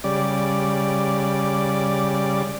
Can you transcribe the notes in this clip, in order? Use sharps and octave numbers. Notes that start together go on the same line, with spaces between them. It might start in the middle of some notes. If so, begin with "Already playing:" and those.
C#3 G3 D5